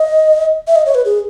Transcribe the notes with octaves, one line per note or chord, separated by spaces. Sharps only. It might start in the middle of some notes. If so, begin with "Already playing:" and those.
Already playing: D#5
E5
D#5
C#5
B4
G#4